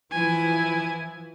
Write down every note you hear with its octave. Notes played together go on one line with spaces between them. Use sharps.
E3 F3 E4 G#5